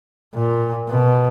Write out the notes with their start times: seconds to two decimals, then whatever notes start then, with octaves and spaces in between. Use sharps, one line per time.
0.35 A#2
0.89 B2